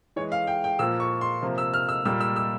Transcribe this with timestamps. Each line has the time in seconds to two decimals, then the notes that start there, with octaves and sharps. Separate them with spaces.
0.16 E3 G#3 C#5
0.32 F5
0.47 G5
0.64 G5
0.79 A#2 F3 A#3 E6
1.00 C#6
1.21 C6
1.42 C3 F3 A#3
1.58 E6
1.74 F6
1.89 E6
2.05 A#2 G3 A#3 E6
2.20 E6
2.36 E6